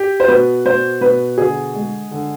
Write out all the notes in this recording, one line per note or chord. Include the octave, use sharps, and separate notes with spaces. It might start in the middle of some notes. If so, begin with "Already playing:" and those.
Already playing: G4
C5
B2 B4
B2 C5
B2 B4
D3 G#4
G#3
D3